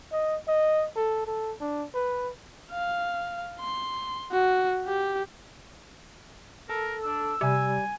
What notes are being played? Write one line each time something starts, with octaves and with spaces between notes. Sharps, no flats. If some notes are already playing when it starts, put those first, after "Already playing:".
D#5
D#5
A4
A4
D4
B4
F5
C6
F#4
G4
A4 A#4
D4 E6
C3 G3 G#5